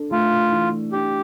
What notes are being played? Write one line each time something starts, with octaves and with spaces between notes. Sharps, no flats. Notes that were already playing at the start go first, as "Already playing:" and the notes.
Already playing: D4 A4
A3 F4
E3
D4 G4